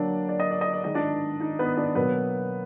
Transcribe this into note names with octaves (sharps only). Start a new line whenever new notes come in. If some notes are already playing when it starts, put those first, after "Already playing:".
Already playing: D3 F#3 A#3 D4 D5
D5
D#5
D5
D#5
D5
D#3 G#3 D#5
D4 D5
D#4
B3 B4
D4 D5
B2 F#3 A#3 B3 B4